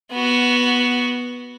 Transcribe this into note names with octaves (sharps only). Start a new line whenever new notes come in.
B3 F#4